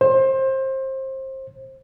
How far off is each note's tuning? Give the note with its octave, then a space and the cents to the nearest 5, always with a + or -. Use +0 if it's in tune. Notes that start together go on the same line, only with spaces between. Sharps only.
C5 +25